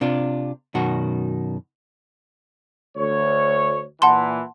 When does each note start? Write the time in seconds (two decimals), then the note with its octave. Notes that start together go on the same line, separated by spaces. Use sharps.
0.01 C3 D4 F4
0.75 F#2 B2 D#3 F#4
2.97 D2 C#5
4.02 A#2 E3 F#5 A5 C6